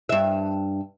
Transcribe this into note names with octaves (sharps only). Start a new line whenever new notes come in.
G2 E5